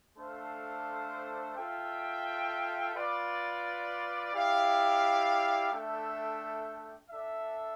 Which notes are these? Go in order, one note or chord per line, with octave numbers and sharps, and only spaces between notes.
A3 D4 A4 C5 F5
F4 A4 E5 G5
F4 B4 D5
E4 G4 D5 F5
A3 D4 A4 E5 G5
D4 A4 E5